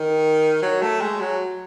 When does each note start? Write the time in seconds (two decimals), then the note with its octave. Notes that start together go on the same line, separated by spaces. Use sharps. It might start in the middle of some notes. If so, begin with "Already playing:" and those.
Already playing: D#3
0.62 F#3
0.82 A3
1.01 G#3
1.20 F#3